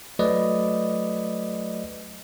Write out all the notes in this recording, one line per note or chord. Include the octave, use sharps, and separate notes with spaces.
F#3 A3 B4 D5 D#5